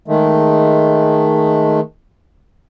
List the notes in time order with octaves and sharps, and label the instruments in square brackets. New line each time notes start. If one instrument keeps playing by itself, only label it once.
[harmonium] D#3 G#3 A3